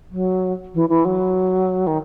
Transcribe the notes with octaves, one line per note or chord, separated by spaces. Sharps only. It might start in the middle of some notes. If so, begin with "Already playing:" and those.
F#3
E3
E3
F#3
D#3